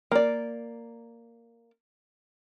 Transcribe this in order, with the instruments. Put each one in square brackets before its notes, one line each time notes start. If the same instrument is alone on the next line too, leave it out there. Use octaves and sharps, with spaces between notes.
[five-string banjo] A#3 D5